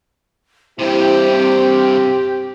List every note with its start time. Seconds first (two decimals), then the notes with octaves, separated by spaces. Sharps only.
0.79 G2 C3 E4 G4 C5
1.30 C4